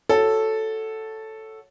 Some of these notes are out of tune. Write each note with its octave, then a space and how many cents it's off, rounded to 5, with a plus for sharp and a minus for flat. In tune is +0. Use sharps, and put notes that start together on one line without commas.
F#4 +0 A4 +0 C#5 +0